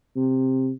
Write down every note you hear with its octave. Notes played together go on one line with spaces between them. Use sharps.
C3